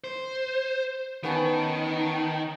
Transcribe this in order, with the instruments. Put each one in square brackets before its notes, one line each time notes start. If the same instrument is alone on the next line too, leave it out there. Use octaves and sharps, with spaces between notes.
[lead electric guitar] C5
[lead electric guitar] D#3 [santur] B3 C#4 A5